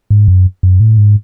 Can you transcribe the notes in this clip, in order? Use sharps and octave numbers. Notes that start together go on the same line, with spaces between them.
G#2
F#2
F#2
A2
G#2